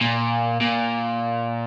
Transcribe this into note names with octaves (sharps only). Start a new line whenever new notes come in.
A#2
A#2